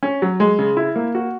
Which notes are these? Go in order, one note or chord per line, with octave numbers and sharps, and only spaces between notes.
C#4
F#3
G#3
C#3
E4
A#3
F#4